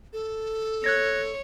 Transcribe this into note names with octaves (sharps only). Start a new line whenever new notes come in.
A4
C#5 F#6 G#6 A#6